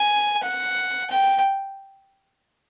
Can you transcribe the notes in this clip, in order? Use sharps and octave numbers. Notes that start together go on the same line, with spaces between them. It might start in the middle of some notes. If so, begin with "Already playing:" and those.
Already playing: G#5
F#5
G5